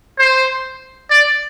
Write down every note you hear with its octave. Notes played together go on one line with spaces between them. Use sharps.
C5
D5